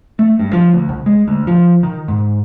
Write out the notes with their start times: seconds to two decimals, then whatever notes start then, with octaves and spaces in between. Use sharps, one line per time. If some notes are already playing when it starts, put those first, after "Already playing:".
0.19 A3
0.39 G2
0.53 F3
0.73 D2
0.89 C2
1.06 G#3
1.28 D2
1.47 F3
1.83 D#3
2.08 G#2